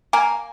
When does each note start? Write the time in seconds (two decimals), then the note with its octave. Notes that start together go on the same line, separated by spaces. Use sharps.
0.13 A#3 G#5